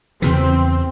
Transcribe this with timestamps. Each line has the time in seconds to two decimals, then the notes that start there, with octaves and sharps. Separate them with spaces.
0.22 E2 C#3 E3 C4